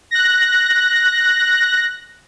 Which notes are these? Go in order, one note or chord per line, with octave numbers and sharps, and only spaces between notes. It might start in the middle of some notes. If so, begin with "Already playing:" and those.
F#6 A#6